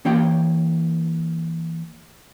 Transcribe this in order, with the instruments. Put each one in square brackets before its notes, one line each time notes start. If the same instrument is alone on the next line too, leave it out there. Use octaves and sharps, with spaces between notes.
[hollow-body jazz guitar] E3 A#3 C#5 G5